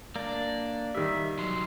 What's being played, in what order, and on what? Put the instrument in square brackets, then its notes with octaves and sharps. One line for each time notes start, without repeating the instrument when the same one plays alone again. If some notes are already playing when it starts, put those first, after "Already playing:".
[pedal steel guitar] A#3 D4 [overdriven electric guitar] D5
[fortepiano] D#3 G3 [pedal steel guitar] E5
[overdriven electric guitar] F#3 D#4 [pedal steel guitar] C6